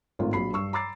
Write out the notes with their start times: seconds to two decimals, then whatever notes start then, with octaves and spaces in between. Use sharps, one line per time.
0.19 G#1 A2 D#3 F4
0.33 A#1 F#3 B5 C7
0.53 G2 C#6 E6
0.73 A#5 B5 D6 E6 A6 C7